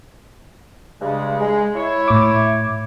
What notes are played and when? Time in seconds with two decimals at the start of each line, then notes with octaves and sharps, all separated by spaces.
1.01 G2 C#3 G#3
1.40 G#3
1.76 E4 C#5
2.08 A2 D6